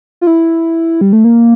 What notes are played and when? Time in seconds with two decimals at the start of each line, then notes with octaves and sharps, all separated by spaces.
0.21 F4
0.27 E4
1.01 G3
1.13 A3
1.24 A#3